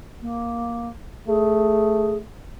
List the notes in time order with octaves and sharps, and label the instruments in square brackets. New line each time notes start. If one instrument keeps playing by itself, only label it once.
[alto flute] A#3
[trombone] A3 [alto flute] G#4